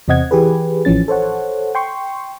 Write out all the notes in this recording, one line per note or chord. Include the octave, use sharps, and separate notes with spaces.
E2 C3 C4 D#5 F#5 G#6
E3 G4 G#4 B4
A1 E3 F3 C#4 A6
A4 C5 C#5 F#5
G5 C6 C#6